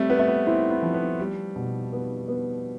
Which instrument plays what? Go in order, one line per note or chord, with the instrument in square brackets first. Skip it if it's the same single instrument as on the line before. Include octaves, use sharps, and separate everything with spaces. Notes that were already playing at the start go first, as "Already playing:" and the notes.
Already playing: [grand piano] G3 A3 [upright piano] C4
[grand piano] B3 [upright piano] B4
[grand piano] A3
B3
[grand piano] C4 [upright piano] E4
[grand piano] B3
[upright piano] F3
[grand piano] B3
[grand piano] G3 [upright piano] G4
[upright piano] B2
B3
B3